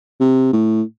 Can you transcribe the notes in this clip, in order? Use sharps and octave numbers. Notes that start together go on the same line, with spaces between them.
C3
A2